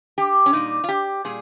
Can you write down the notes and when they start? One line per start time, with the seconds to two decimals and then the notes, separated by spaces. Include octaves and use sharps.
0.18 G4
0.46 C#4
0.53 A#2 G3 D#4
0.84 F4
0.89 G4
1.25 A#2 G3 G#4